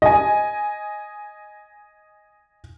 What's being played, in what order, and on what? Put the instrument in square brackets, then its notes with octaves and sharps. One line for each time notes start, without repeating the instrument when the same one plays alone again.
[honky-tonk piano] D#5 G#5